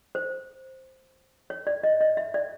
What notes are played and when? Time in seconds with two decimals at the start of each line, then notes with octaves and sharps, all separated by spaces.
0.15 C5
1.50 C#5
1.67 D5
1.83 D#5
2.01 D#5
2.17 E5
2.34 D5